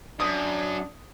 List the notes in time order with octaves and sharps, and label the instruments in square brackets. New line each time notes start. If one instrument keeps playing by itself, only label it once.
[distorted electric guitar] F#2 [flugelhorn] D4 [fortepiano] D#6